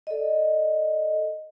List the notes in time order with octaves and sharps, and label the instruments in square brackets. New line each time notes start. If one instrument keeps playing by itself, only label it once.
[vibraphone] A4 D5 D#5